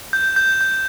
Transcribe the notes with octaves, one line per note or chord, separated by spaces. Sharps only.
G6
G6
G6